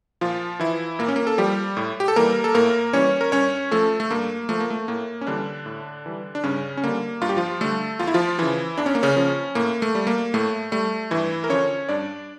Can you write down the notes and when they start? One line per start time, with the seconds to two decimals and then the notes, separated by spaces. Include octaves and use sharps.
0.21 A#2 F3 F4
0.59 E3 F3 E4
0.99 A#2 A#3
1.08 C#4
1.16 A#3
1.27 A4
1.38 F3 G3 G4
1.77 A2
2.00 G4
2.08 A4
2.16 E3 G3 A#3 A#4
2.44 A4
2.54 A2 A#3 A#4
2.93 E3 G3 C#4 C#5
3.21 A#4
3.32 G2 C#4 C#5
3.71 F3 A3 A4
4.00 A3
4.11 G2 A#3
4.49 F3 A3
4.60 A#3
4.70 A3
4.88 A2 A#3
5.21 C#4
5.27 D3 E3 G3 D4
5.66 A2
6.06 E3 G3
6.35 D4
6.43 G2 C#3 C#4
6.77 C#4
6.84 D3 G3 A#3
7.21 G2 F4
7.29 G4
7.37 F3 F4
7.61 D3 G3 A3 A4
7.99 E2 F4
8.07 E4
8.14 F3 F4
8.38 C#3 E3 F3 E4
8.78 E2 D4
8.86 C#4
8.95 A#3
9.03 C#3 C#4
9.16 C#3 F3
9.55 A2 A#3
9.82 A3
9.95 G3
10.07 A#3
10.34 A2 A3
10.72 G3 A3
11.11 G2 E3 E4
11.44 A#4
11.50 D3 F3 C#4 C#5
11.89 G2 D4 D5